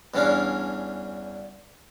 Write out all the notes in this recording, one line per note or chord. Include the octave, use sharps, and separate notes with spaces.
E2 G2 E3 C#4 D4 F5